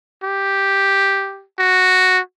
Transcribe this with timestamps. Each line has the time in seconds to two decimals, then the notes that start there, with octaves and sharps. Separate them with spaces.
0.23 G4
1.59 F#4